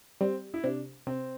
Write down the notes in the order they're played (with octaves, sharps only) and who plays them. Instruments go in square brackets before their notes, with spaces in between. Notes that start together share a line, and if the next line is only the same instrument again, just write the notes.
[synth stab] G3 [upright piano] C4
[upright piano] E4
[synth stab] C3 [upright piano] D4
[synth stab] C3 [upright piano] C4